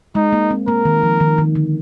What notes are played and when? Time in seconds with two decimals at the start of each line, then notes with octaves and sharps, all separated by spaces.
0.15 G#3 D#4
0.33 A#3
0.51 C4
0.68 A#3 A#4
0.85 D#3
1.03 F3
1.20 D#3
1.38 D#3
1.55 D3